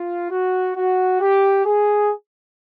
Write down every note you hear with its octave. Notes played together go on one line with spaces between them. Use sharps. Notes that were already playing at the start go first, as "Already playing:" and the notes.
Already playing: F4
F#4
F#4
G4
G#4